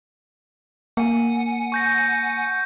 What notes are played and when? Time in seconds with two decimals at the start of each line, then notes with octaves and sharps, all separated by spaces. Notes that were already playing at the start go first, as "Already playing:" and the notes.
0.97 A#3 F#5 G#5
1.72 C#6 G6 A#6